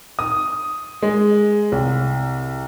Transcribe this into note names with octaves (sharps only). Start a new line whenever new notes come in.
D#6
G#3
C2